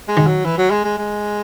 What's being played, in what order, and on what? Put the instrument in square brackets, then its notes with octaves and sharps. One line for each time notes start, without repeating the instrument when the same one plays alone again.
[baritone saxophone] G#3
[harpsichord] D#3
[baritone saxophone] F#3
E3
F#3
G#3
G#3
G#3